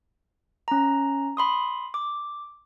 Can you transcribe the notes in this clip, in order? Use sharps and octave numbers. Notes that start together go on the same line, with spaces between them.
C#4 A#5
B5 C6 D#6
D6